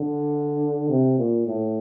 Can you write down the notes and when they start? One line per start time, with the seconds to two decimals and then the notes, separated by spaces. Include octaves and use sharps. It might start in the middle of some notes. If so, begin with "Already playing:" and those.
Already playing: D3
0.89 C3
1.18 A#2
1.47 A2